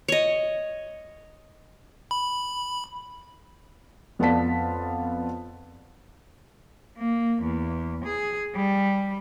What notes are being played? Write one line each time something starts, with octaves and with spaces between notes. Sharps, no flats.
C#5 D#5
B5
F2 B3 F4 D5 A5 B6
A#3
E2
G#4
G3